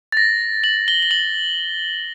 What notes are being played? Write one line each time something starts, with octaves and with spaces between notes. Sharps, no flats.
A6
A#6
F#7
G7
G7
F#7